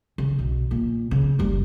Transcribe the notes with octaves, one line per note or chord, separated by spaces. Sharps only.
C#3
B1
A#2
C#3
F#1 G3